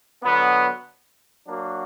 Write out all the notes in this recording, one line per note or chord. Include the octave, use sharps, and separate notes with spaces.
D3 F#3 B3
F#3 A#3 D4 F#4